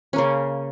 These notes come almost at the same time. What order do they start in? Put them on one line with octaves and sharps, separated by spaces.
C#4 A#3 C#3